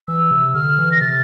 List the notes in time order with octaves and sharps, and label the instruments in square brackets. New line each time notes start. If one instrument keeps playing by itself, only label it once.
[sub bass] E3 [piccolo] E6
[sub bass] C3
[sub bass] D3 [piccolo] F6
[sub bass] E3
[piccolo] A#6
[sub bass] C3 [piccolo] A6